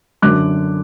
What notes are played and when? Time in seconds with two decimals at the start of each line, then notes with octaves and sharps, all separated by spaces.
0.22 F#2 D3 D6 F#6